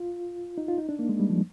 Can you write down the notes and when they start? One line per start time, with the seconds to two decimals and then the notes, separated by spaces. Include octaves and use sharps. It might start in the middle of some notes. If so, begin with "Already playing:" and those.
Already playing: F4
0.58 D#4
0.68 F4
0.78 D#4
0.89 D4
0.99 A#3
1.09 G#3
1.19 G3
1.30 F3